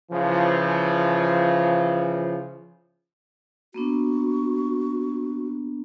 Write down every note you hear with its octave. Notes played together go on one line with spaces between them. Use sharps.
C#3 E3 F3
A#3 B3 D4 F#4